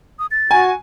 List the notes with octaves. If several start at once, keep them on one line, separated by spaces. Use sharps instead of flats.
D#6
A6
F#4 G#5